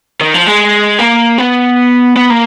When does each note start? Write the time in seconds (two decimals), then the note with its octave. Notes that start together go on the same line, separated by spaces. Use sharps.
0.21 D#3
0.34 F3
0.47 G#3
0.99 A#3
1.38 B3
2.16 B3
2.30 A#3